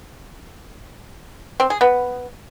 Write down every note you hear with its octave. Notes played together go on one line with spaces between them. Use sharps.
C4
G#4
B3